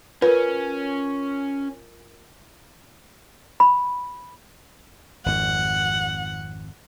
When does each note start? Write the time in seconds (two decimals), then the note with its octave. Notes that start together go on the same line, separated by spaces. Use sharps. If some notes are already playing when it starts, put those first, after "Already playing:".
0.22 C#4 F4 A#4 B4
3.60 B5
5.26 G#1 F2 F#5